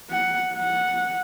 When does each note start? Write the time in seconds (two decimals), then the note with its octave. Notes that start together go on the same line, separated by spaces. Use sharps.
0.10 F#5
0.54 F#5